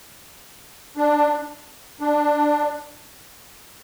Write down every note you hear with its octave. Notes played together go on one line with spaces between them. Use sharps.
D4
D4